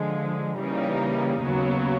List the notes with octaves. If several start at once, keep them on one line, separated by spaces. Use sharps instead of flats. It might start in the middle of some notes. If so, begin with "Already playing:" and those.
Already playing: D3 F3 G#3
C#3 E3 G3 A#3 D#4
D#2 C#3 F#3 B3